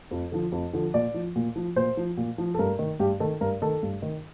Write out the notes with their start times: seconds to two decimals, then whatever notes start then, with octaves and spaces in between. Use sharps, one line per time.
0.11 F2
0.32 D3 F3
0.52 F2
0.73 D3 F3
0.94 A#2 D5
1.14 F3
1.36 A#2
1.56 F3
1.76 A#2 C5
1.97 F3
2.17 A#2
2.38 F3
2.54 A4
2.59 G2 A#4
2.79 D#3
3.00 G2 G4
3.20 D#3 A4
3.41 G2 A#4
3.62 D#3 A4
3.83 G2
4.02 D#3